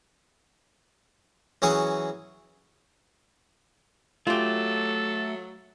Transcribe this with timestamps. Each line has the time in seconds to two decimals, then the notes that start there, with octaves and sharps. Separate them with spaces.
1.62 E3 F#3 C#4 G#4 C#5
4.27 F#3 A3 F4 G4 A4